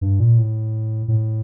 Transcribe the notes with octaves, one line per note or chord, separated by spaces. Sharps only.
G2
A#2
A2
A2